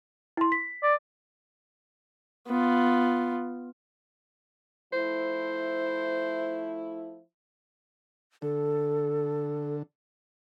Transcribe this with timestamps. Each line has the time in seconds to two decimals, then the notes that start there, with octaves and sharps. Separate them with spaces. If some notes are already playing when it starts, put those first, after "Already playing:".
0.37 E4 C6
0.52 B6
0.83 D5
2.48 B3 F4
4.93 F3 A3 E4 C5
8.42 D3 A4